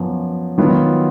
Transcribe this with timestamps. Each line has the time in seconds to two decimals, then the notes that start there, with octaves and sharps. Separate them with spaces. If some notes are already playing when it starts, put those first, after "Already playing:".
Already playing: F#2 F3 B3
0.58 D#3 F#3 B3 F4